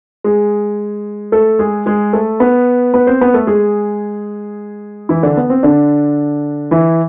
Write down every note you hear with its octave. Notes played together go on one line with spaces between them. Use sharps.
G#3 G#4
A3 A4
G#3 G#4
G#3 G#4
A3 A4
B3 B4
B3 B4
C4 C5
B3 B4
A3 A4
G#3 G#4
E3 E4
D3 D4
B3
C4
D3 D4
E3 E4